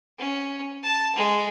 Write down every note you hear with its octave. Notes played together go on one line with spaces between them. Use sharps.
C#4
A5
G#3